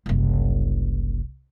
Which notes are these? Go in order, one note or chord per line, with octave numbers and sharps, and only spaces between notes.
F#1 C2